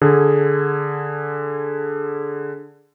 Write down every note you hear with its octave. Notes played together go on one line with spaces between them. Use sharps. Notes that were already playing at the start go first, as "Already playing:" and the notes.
D3 G#4